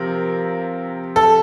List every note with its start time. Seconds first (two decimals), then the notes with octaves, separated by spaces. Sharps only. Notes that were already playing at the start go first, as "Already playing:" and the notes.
Already playing: C3 F3 C4 A#4
1.16 A4